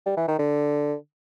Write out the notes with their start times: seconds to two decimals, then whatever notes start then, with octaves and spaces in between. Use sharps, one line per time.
0.06 G3
0.17 E3
0.28 D#3
0.39 D3